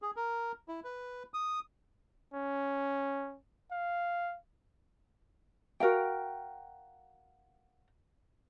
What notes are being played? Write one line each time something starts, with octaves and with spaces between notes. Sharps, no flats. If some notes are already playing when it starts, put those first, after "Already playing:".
G#4
A#4
E4
B4
D#6
C#4
F5
F#4 A#4 F5 G5